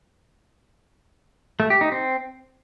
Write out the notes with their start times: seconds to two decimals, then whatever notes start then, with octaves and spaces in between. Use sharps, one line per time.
1.60 A3
1.70 G4
1.81 D#4
1.92 C4